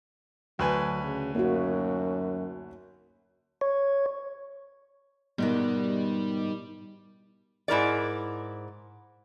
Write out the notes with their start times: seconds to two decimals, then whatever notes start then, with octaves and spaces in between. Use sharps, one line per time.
0.59 D2 F#3 B4 G#5
1.03 C#3
1.35 F#2 A#3 D#4 F#4
3.61 C#5
5.38 G#2 B2 D#3 G3 B3
7.68 G#2 E4 A#4 D5